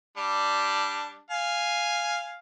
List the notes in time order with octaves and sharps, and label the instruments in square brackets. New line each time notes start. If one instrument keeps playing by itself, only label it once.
[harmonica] G3 D4
F5 G#5